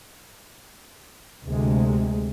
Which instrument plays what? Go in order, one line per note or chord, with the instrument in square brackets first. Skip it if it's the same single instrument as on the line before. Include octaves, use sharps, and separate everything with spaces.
[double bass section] D2 C3 G#3